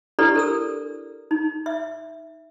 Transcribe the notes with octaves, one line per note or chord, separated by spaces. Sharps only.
D4 E4 G4 A4 B4 D5
A4 A#4 E6
D#4
E5